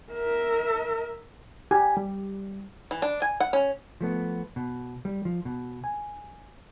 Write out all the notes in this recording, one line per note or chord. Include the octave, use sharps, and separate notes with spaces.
A#4 E5
G4 G#5
G3
E3
D4
G#5
F#5
C#4
F3 A3 B3
B2
G3
F3
B2
G#5